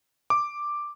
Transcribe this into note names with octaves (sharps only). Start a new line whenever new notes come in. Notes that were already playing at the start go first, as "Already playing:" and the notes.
D6